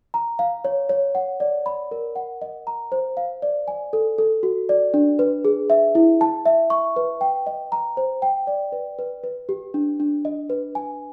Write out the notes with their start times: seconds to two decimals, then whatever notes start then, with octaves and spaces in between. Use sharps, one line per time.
0.14 A#5
0.39 F5
0.65 C#5
0.89 C#5
1.15 F#5
1.40 D5
1.66 B5
1.91 A#4
2.16 F#5
2.42 D#5
2.67 A#5
2.92 C5
3.17 F5
3.42 D5
3.68 G#5
3.93 A4
4.18 A4
4.43 F#4
4.69 D5
4.94 D4
5.19 B4
5.45 G#4
5.70 E5
5.95 E4
6.21 A5
6.46 E5
6.70 C#6
6.96 B4
7.21 G5
7.47 D#5
7.72 A#5
7.97 C5
8.22 G5
8.47 D5
8.72 B4
8.99 B4
9.24 B4
9.49 G4
9.74 D4
10.00 D4
10.25 D#5
10.50 B4
10.75 G#5